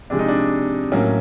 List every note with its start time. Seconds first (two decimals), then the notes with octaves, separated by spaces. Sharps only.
0.10 C3 F3 G#3 D4
0.19 D#4
0.28 D4
0.92 A2 F#3 A#3 C#4